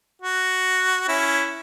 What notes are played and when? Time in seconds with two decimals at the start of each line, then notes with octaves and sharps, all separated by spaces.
0.22 F#4
1.09 C#4 E4